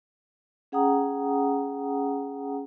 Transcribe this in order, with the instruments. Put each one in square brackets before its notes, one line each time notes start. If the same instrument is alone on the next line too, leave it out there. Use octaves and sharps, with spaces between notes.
[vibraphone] C#4 G#4 F#5 G5 A#5 D#6